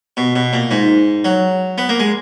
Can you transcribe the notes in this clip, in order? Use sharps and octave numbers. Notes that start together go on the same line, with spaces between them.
B2
B2
A#2
G#2
F#3
B3
A#3
G#3